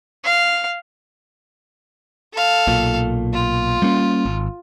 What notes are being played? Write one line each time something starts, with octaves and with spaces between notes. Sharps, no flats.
F5
A4 F5
B1 A#2
F4
G3 A#3 C#4
G#1